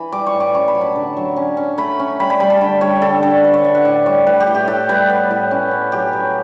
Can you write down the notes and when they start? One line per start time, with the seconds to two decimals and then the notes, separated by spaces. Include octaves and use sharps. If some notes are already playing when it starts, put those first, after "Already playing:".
Already playing: E3 B5
0.12 G3 D6
0.27 C#6
0.34 A2
0.40 D6
0.54 C#4 C#6
0.68 B5
0.75 F#3
0.81 A5
0.96 D3
1.17 F#3
1.36 C#4
1.57 C#4
1.78 A3 B5
1.99 C#4
2.20 G3 B5
2.30 B5
2.40 G3 B5
2.50 A5
2.61 D3 G5
2.81 G3 C#5
3.02 D3 A4
3.23 D3 A4
3.44 D4 B4
3.54 C#5
3.65 D4 E5
3.75 F#5
3.85 A2 D5
4.06 G3 C#5
4.27 A2 B4
4.40 G4
4.47 A2
4.55 G4
4.67 A2 A4
4.89 G3 B4
5.10 B3
5.31 A2
5.51 C#4
5.71 C#4
5.92 F#3 G4
6.13 F#3